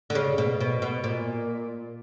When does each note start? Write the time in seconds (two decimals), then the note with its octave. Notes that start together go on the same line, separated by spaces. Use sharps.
0.10 D3
0.15 C#3
0.38 B2
0.60 B2
0.82 B2
1.04 A#2